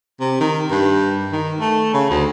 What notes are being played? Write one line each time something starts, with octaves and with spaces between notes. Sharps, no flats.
C3
D#3
G2
D#3
A3
C#3
D2